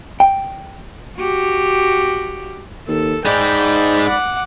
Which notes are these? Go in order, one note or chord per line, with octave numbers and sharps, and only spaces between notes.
G5
F#4 G4
D#2 A4
G#2 G#3 D#4 D5 G5 B5
F#5 D6